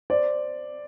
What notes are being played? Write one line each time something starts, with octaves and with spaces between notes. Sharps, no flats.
C5 D5